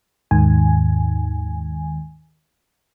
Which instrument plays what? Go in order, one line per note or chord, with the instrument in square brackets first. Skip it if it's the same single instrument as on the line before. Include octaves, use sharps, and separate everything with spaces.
[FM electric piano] D#2 G#2 D#3 G#5